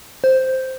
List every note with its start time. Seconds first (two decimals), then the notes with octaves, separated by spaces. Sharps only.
0.24 C5